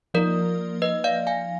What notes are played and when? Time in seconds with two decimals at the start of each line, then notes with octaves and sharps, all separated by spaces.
0.14 F3 A#3 D#4 A#4 D5
0.82 B4 D#5
1.04 D5 F5
1.27 F5 G#5